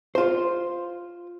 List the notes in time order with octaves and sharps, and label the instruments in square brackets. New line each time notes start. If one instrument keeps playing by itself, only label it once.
[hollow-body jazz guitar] F4 C5